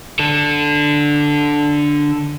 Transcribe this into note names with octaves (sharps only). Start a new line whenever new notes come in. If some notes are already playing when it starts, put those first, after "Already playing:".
D3 A4